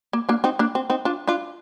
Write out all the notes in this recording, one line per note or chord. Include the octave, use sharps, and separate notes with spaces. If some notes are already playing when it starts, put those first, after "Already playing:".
A#3
A#3 D4
C4 D#4
A#3 D4
C4
C4 D#4
D4 F4
D4 F4